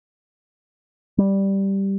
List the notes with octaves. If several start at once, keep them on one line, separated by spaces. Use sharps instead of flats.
G3